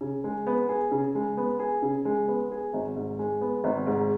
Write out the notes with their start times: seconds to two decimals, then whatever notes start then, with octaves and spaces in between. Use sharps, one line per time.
0.01 C#3
0.24 G#3
0.47 B3
0.69 G#4
0.92 C#3
1.15 G#3
1.37 B3
1.59 G#4
1.82 C#3
2.05 G#3
2.28 B3
2.51 G#4
2.73 G#1
2.96 G#2
3.19 G#3
3.41 B3
3.64 G#1
3.87 G#2